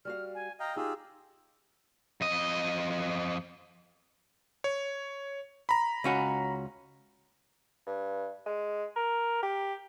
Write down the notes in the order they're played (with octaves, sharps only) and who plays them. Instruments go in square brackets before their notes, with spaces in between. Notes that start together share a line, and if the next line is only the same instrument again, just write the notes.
[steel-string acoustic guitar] G3 F#4 F5 [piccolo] F6
[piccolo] G#5
[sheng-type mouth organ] D#5 F5 G5 [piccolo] A#5
[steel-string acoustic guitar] D#4 [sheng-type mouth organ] F4 G4 G#4 [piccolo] E6
[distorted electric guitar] F2 D#5
[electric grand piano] C#5
A#5 B5
[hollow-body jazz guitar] C#2 C#4 F#4
[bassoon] G2
G#3
A#4
G4